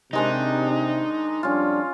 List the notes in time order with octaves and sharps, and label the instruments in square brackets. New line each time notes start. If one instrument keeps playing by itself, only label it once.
[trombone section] C3 [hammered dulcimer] D#3 G#3 D4 [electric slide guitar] D#4
[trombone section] F2 G3 D4 [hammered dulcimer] C#4 F4